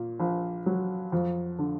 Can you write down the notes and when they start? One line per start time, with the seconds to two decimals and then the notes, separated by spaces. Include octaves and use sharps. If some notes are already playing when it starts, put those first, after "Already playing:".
Already playing: A#2
0.20 A#1
0.66 F#3
1.12 F2
1.59 D3